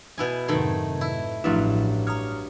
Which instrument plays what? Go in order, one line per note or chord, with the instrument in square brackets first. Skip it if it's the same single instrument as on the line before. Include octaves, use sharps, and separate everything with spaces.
[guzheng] B2 E4 G#5
[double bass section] F#2 A2 C3 [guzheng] D#3 A3 C6 [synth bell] B4 G#6
[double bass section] A2 [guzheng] E4
[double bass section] A1 [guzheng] G2 F#3 [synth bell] F3 A3 E4
[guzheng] C#5 [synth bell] A#5 D#6 F6